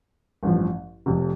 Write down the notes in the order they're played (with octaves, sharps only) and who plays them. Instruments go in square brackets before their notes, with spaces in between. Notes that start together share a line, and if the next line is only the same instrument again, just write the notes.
[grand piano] A1 G2 F3
F1 F2 C3